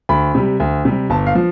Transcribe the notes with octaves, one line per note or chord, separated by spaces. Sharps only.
D2 B5
C3 G3
D2
C3 G3
G1 A5
F5
F3